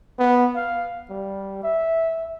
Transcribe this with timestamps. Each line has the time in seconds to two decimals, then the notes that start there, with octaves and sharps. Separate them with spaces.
0.19 B3
0.56 F5
1.10 G3
1.63 E5